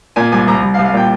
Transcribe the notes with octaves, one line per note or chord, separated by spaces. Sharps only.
A#2 G#5
C2 G#5
C2 A#5
C2
F5
C2
F5
A#2 G5